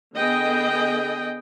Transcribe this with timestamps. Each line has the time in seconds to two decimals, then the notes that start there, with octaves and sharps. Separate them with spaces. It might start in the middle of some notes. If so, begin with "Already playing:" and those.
0.14 D3 B3 G#4 D#5 G5